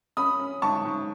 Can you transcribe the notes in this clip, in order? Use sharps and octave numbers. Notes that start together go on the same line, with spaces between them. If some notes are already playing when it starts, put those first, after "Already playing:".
C#4 B5 D#6
C#4
G#2 A5 C#6
G#2